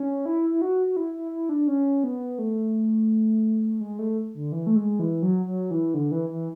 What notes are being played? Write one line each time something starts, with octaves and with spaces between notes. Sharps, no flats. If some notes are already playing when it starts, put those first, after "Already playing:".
Already playing: C#4
E4
E4
F#4
F#4
E4
E4
E4
D4
C#4
B3
A3
G#3
A3
D3
E3
A3
G#3
E3
F#3
F#3
E3
D3
E3
E3